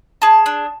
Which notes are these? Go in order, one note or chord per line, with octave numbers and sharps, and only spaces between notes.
G#4 A5
D4